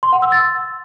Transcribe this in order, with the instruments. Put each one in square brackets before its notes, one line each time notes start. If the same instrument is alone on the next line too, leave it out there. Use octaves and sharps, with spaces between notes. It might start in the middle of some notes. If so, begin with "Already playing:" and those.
[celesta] C6
F#5
E6
A6